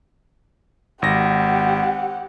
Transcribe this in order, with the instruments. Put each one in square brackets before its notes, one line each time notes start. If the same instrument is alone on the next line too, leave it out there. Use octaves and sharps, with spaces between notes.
[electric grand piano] G#1 A#6 [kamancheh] G4 F#5